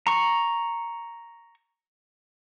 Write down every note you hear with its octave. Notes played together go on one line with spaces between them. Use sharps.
A#5 C#6